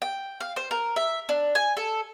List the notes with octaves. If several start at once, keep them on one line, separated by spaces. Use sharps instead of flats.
G5
F5
C5
A#4
E5
D4
G#5
A4